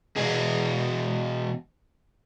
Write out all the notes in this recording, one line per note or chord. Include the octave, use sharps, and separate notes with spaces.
E2 B2 G#4